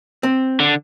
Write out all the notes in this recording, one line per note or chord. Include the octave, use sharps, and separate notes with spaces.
C4
D3